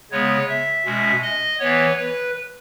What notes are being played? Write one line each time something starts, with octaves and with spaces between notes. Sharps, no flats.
C#3 G#3 B3 C#5
E5
B2 G#3 C#4
D#5
E3 B3 C#5
B4